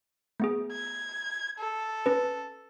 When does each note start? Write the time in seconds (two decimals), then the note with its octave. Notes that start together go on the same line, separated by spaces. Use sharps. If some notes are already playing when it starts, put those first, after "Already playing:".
0.40 A3 B3 G#4
0.72 G#6
1.58 A4
2.06 C#4 B4